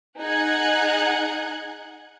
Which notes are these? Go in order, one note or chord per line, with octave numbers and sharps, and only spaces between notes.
D#4 G#4 F#5 F#6 G#6